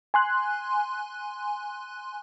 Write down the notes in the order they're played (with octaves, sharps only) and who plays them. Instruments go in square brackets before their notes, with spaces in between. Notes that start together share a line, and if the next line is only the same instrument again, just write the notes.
[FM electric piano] G#5 C6 F#6